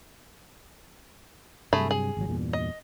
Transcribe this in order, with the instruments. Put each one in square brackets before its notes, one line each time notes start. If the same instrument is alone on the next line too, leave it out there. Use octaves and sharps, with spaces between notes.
[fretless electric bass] G2 C3 F#3 [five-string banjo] A3 G#4 B5
[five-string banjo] G#4
[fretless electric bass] G#1 F#3
E2 G2 A#2
[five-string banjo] D#5